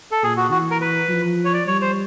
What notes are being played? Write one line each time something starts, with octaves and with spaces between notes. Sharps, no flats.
A4
A#2 G#4
F#4
E3 F#4
A#4
B4
F3
C#5
D5
G3 C#5
C5